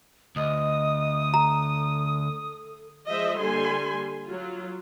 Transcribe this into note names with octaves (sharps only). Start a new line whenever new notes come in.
D2 D#5 D#6
A4 A#5
F3 G#3 C5 D#5 E5
D3 G3 A#3 A4 G#5 C6
F#3 F4